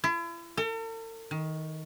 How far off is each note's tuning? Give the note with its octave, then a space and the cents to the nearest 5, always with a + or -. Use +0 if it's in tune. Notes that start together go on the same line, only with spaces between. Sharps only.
E4 +40
A4 +45
D#3 +20